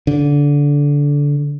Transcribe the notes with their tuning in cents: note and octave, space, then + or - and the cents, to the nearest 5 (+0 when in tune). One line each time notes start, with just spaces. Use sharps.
D3 -20